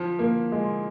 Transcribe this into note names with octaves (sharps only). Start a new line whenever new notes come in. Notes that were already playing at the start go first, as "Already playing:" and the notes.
Already playing: F3
A#3
G#3